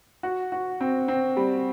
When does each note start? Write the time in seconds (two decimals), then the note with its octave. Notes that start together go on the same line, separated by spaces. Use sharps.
0.23 F#4
0.52 F#4
0.81 C4
1.08 C4
1.37 G3